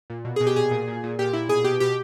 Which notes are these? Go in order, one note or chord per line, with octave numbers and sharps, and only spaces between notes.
A#2
B2
B2 G#4
G4
A#2 G#4
A#2
A#2
A#2
A#2 G4
A#2 E4
B2 G#4
B2 G4
B2 G4